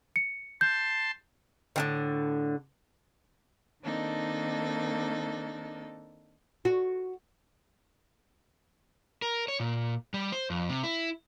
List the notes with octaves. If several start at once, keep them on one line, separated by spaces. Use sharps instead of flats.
C#7
A5 C6 G6
A2 D3 D#3
D#3 A#3 C4 D4 D#4 A4
F#4
A#4
C#5
A#2
G3
C5
F2
C3
E4